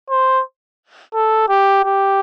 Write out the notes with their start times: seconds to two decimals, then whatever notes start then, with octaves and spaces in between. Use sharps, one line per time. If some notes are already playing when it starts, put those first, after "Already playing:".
0.10 C5
1.14 A4
1.48 G4
1.84 G4